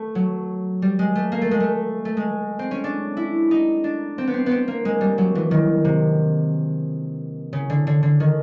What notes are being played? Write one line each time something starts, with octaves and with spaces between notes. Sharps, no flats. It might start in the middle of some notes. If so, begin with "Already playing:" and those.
Already playing: A3
F#3
G3
G#3
A3
A#3
A3
G#3
A3
A3
G#3
C4
C#4
D4
E4
D#4
D4
C4
B3
C4
B3 C4
A#3
G#3
G3
F#3
E3
D#3
C3
C#3
D3
D3
D3
D#3